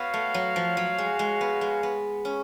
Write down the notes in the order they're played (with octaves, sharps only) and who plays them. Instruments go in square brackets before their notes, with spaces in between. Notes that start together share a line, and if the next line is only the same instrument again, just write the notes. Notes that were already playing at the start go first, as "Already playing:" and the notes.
Already playing: [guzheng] B3 [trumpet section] F#4 C#5 F5
[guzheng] A3
F#3
F3
F#3
G#3
G#3
B3
G#3
B3
C#4